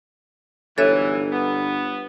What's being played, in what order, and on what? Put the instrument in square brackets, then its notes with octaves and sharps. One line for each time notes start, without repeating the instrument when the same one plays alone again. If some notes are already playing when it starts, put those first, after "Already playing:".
[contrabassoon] G1 [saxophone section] D2 G#2 E3 [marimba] A4 C#5 E5
[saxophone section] B3